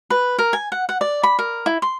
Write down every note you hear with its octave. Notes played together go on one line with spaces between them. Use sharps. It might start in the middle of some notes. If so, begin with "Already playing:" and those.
B4
A#4
G#5
F#5
F#5
D5
B5
A#4
E4
C6